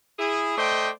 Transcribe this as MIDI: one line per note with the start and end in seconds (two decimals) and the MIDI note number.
0.19 0.57 64
0.19 0.57 68
0.57 0.89 57
0.57 0.89 72
0.57 0.89 74
0.57 0.89 75
0.57 0.89 79